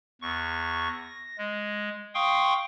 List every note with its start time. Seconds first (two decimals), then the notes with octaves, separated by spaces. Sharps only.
0.21 E2 C#6
0.89 A#6
1.38 G#3
2.14 F5 G5 C6 C#6 D#6